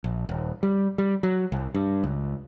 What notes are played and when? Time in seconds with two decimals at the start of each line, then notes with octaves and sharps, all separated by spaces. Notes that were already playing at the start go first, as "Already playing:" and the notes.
0.04 A#1
0.29 D#1
0.63 G3
0.98 G3
1.23 F#3
1.52 C2
1.74 G2
2.04 C#2